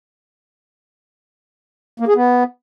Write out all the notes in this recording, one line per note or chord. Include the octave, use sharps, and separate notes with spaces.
A#3
G#4
B3